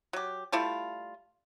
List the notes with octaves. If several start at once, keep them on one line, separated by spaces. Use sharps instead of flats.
F#3 G4
G3 A3 E4 F4